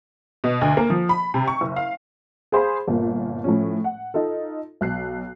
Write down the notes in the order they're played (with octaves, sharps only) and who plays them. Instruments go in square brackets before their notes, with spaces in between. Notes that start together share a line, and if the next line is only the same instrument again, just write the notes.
[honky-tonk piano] B2
D2
A#3
F3
B5
C3
C#6
F#1
F5
G#4 C5 F5 B5
G1 A#2 A#3
A2 F3 C#4
F#5
D#4 F4 A4
B1 F#6 C7